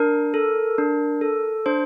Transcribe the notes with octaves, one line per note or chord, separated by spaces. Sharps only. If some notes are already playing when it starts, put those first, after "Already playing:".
Already playing: D4 A#4
A4
D4
A4
D4 C5